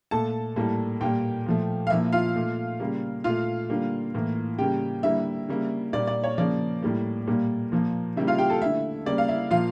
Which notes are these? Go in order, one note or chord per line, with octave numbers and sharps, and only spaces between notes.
A#2 A3 A4 A5
A2 G3 A#3
A#2 G3 A#3 G4 G5
A#2 F3 A3
F5
A#2 F3 A#3 E4 E5
F4 F5
A#2 A3
C#3 G3 A#3
A#2 A3 F4 F5
D3 G3 A#3
A2 E3 A#3
C#3 G3 A#3 G4 G5
D3 G3 A#3 E4 E5
C#3 G3 A#3
A#2 G3 A#3 D5
D5
C#5
C#3 F3 A#3 D5
A2 G3 A#3
A#2 G3 A#3
A#2 F3 A#3
C#3 G3 A#3 E4 E5
F4 F5
G4 G5
A4 A5
D3 A3 E4 E5
C#3 G3 A#3 D5
F5
E4 E5
A#2 F3 A#3 F4 F5